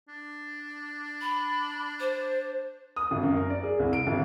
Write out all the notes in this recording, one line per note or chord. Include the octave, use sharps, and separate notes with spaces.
D4
B5
C5
D#6
G#1
F#2
A#4
D5
G#4
C2
D7
G#1